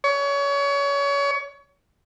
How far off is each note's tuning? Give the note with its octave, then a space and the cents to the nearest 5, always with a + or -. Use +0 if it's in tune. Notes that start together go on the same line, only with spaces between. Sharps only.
C#5 +30